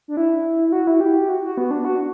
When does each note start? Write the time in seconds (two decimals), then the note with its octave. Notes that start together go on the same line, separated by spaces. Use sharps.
0.08 D4
0.17 E4
0.68 E4
0.72 F#4
0.87 E4
1.00 G4
1.29 F#4
1.43 F#4
1.57 B3
1.71 D4
1.85 F#4